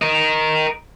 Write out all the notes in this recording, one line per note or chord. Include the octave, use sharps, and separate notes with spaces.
A#4 D#5